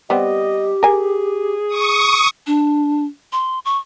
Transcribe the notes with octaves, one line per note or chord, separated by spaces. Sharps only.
G3 B3 C4 G4 D#5
G#4 A#4 G#5
C#6 D#6
D4
C6
C#6